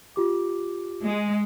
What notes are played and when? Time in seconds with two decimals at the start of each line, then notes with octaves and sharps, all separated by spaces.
0.16 F4 G4 D6
1.05 G#3